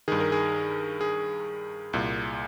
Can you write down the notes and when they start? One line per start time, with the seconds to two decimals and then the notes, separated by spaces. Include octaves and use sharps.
0.08 G2 D#3 G#4
0.20 A#4
0.32 G#4
1.01 G#4
1.93 C2 A#2